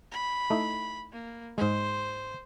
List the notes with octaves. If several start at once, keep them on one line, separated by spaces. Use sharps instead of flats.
B5
A3 D#4 E4
A#3
G#2 G#3 C5